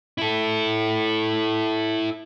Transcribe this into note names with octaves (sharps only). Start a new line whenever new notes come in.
E4 A4